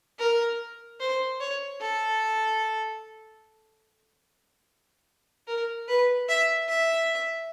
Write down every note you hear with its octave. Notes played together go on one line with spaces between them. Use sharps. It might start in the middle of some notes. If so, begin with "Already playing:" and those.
A#4
C5
C#5
A4
A#4
B4
E5
E5